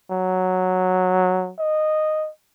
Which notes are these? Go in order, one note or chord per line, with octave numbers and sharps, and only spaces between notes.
F#3
D#5